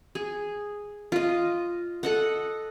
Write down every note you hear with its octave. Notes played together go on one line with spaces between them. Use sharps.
G#4
F4 D#5
A4 D#5 F#5